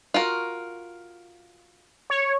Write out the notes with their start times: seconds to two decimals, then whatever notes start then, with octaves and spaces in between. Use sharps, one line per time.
0.14 F4 F#4 A#4
2.10 C#5